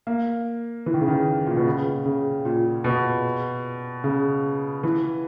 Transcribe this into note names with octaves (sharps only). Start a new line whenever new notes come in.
A#3
E3
D#3
C#3
D#3
A#2
B2
C#3
C#3
A#2
B2
C#3
E3